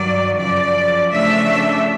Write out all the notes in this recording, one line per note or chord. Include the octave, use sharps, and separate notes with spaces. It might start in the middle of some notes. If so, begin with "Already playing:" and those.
Already playing: G2 D#3 F#3 D5
F#2 C#3 F3 D5
C#3 F3 A3 D4 E5